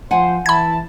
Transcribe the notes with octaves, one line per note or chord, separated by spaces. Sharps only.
F3 C5 F#5 G#5
E3 E4 A5 B5 G#6